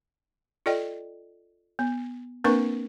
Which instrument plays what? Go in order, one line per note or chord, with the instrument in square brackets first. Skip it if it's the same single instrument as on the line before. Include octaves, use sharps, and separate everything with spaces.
[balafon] F4 A4 D5 D#5 G5
B3
A#3 C4 D4 A#4 B4 C#6